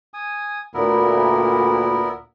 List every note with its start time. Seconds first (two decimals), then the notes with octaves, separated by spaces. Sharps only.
0.14 G#5 D#6
0.74 D2 A#2 B3 E4 A#4